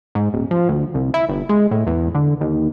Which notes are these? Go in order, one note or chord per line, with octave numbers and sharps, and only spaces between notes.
G#2
D#1
F3
D2
C2
E4
G1
G#3
A2
E2
D3
D#2